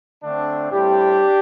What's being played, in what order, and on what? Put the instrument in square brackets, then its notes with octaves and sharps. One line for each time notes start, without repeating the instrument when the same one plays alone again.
[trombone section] D3 A3 C4 D4
A2 G3 C4 D4 G4